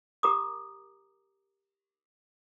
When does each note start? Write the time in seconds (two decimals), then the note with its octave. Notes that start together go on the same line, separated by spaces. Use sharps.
0.23 G4 A#4 A#5 D6 D#6